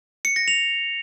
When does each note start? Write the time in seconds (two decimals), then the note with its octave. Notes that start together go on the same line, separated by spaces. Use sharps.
0.25 C#7
0.36 A#6
0.48 F7